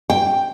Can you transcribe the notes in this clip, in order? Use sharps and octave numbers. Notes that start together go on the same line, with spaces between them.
G5